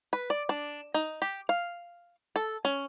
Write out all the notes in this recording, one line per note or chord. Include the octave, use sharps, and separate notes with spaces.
B4
D5
D4
D#4
G4
F5
A4
C#4